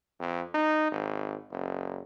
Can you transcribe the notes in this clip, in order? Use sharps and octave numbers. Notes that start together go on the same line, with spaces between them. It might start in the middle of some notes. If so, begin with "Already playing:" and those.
F2
D#4
G#1
F#1